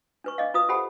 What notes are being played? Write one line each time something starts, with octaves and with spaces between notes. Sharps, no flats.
D4 B4 C#6
D4 G#4 D#5 F5
F4 B4 F5 D#6
G4 A4 C5 F#5 G#5 B5